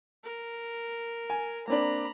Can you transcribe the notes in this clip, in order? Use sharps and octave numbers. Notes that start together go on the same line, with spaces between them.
A#4
G#5
A#3 C4 D4 A#5 B5